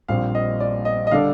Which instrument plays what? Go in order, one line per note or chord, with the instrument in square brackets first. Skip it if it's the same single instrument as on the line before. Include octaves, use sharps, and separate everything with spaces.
[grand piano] A#1 A#2 G3 C4 [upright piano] F5
[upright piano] D#5
D5
D#5
D#5
[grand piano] D3 G3 D4 A4 [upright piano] F5